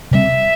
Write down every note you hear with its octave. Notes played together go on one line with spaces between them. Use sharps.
C3 G3 C4 E5